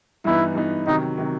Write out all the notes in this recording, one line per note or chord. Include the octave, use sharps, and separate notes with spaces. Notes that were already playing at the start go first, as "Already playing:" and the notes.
G2 E3 B3 D#4 E4
G2 E3 B3 D#4
C3 D#3 F#3 D#4
C3 D#3 F#3